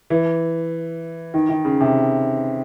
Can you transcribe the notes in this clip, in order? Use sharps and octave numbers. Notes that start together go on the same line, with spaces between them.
E3
D#3
D#3
C#3
C3